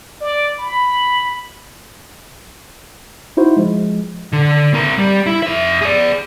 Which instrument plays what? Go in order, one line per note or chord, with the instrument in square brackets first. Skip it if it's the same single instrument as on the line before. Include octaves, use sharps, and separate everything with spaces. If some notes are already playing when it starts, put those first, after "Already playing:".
[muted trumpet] D5
B5
[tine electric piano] D#4 E4 F#4 C5
F3 G#3
[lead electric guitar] D3
C4 A#4
G3
E4
F2 E5
G#4 D5